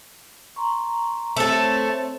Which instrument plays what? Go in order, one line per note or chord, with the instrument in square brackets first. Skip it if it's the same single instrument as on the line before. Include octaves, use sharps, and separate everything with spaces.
[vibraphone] A#5 C6 C#6
[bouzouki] A3 A4 [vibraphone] C4 C5 C#5